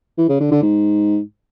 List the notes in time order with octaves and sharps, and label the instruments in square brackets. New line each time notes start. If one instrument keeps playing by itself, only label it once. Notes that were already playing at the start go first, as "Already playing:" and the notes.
[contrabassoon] E3
C#3
D3
D3
G#2